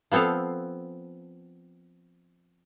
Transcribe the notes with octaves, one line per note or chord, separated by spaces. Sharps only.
F3 B3 C4 A4 F5